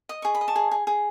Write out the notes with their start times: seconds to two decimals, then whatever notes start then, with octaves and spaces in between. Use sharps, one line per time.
0.09 D#5 D#6
0.22 G#4 C#6
0.35 B5
0.41 D#5
0.48 A5 C#6
0.55 G#4
0.71 G#4
0.87 G#4